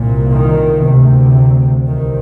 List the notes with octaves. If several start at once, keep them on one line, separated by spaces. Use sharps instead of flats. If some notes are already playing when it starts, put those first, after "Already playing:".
Already playing: C2 A#2
D#3
D2 C3
C2 C3 D#3